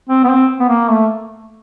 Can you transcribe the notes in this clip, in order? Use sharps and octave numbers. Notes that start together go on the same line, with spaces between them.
C4
B3
C4
B3
A#3
A3